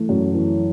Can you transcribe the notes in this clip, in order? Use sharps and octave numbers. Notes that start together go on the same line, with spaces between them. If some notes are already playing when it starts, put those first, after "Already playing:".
Already playing: E3 A3
F#2
E3